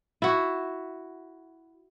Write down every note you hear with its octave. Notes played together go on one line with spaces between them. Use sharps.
E4 F#4